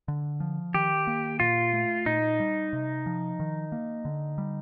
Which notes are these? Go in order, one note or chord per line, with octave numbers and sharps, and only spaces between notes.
D3
F3
D#3 G4
A#3
A#2 F4
A3
A#2 D#4
G3
C3
F3
D#3
A#3
D3
G3